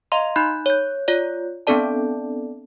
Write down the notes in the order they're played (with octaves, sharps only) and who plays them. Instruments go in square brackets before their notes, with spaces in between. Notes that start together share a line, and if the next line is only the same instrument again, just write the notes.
[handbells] D#5 F5 A#5 C6
D#4 B5 F#6 G6
C#5 G6
F4 C#5 D5
B3 C4 D4 A4 D5 A5